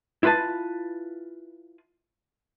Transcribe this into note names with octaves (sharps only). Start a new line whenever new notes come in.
E4 F4 B4 G#5 A5